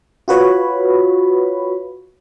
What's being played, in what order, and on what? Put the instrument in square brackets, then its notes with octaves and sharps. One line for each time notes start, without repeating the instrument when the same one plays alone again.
[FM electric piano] F4 F#4 B4 C#5 B5